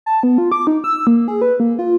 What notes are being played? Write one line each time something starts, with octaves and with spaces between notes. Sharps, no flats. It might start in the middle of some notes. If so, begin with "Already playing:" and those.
A5
B3
F4
D6
D#4
E6
A#3
G#4
B4
A#3
F4